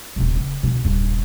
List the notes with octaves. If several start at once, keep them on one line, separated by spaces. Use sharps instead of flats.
D#1 B2
C#3
B2 D3
D#1 G2